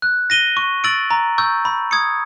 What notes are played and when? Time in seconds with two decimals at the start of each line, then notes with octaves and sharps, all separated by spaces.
0.02 F#6
0.30 A#6 D#7 G7
0.57 C#6
0.84 E6 A6 D7 F#7
1.11 A#5
1.38 C#6 E6 G6
1.65 B5
1.91 D#6 G#6 C#7